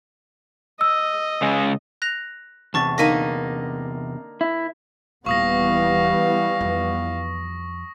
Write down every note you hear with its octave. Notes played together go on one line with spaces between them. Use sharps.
D#5 E6
C#3 G#3
F#6 A#6 F7
E2 C3 A5 C#6 A6
D3 A#3 D#4 A#6 B6 D#7
E4
D#1 E3 G3 B3 F5 C#6 D#6 A#6
F2